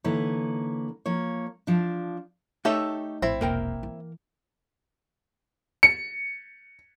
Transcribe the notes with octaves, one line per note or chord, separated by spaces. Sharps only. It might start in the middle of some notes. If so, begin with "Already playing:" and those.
D3 E3 A#3 D#4 B4 C#5
F3 A#3 C#5
F3 D4
A3 D#4 G4 A4 C#5 E5
A#1 A2 C4 E4
E1 A#3 A#4 G5
E3
C#7